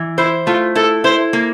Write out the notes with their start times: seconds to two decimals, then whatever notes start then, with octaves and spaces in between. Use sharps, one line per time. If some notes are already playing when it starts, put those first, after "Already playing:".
Already playing: E3
0.18 E4 C5
0.46 A3 F4
0.75 E4 A4
1.04 E4 C5
1.33 A#3